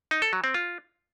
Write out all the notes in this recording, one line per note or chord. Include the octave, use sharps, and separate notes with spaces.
D#4
A4
F#3
C4
F4